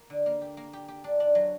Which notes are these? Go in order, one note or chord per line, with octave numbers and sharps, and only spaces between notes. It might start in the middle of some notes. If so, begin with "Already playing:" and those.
Already playing: A#3
D3
A#3
G4
A#3
G4
G4
D4
D4
F#3